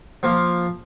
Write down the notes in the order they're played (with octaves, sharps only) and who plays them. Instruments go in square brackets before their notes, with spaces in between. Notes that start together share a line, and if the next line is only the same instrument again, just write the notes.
[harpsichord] F3 A#3 F4